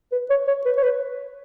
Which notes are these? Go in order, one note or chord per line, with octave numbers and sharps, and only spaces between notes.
B4
C#5
C#5
B4
C#5
B4